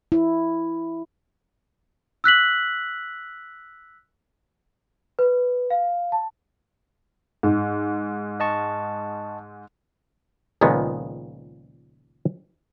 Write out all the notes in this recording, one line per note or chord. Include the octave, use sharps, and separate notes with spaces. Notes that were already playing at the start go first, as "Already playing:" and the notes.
E4
E6 F#6 B6 F#7
B4
F5
A5
G#2
D#5 A5 C#6
C#2 A#2 D#3 F3 G#3 B3